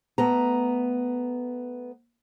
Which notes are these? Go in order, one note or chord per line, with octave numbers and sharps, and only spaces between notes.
A3 B3 A#5